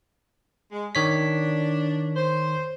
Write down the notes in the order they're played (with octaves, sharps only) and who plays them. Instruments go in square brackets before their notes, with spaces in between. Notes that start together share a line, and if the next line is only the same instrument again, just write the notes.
[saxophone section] G#3
[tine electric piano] D#3 C#5 B6 [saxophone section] D4
[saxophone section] C5